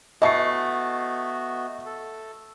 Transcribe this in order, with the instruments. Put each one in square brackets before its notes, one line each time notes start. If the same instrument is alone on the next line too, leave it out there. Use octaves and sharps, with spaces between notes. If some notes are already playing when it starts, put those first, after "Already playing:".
[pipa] E3 A3 [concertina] B3 F#4 [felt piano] D#5 C#6 C7
[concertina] A4